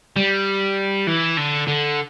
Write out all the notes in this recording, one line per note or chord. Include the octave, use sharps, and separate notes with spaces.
G3
E3
D3
D3